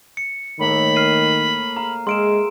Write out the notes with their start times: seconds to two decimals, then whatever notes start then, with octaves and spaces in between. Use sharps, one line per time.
0.17 C#7
0.60 A2 D#3 A#3 B5
0.96 F6 C7 D#7
1.77 F5 A#5
2.07 G#3 G#4 E5 F5 C6 D7 E7